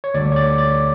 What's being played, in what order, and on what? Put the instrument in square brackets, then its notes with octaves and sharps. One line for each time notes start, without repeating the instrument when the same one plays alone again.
[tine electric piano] C#5
D2 D3 G3 D5
C#5
D5
D5